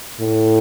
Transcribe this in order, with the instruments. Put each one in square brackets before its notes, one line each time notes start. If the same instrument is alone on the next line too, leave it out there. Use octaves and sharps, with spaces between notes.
[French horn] A2